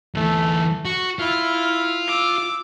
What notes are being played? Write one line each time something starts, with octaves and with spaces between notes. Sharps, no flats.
D2 E3 A3
F#4 C#6
E4 F4 F6
D6 E6